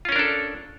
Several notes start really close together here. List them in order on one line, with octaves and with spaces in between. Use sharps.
F4 C#4 A#4 D4 A4